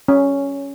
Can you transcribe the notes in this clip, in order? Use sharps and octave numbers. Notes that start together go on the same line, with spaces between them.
C#4